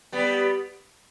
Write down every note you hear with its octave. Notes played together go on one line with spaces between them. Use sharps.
G3 B3